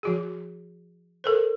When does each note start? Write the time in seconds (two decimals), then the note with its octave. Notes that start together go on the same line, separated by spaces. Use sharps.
0.03 F3 F#4 G#4
1.24 A4 A#4 C5